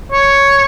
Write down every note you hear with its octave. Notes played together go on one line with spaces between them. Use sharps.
C#5